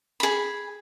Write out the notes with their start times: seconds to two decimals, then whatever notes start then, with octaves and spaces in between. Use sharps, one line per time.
0.20 G#4 B5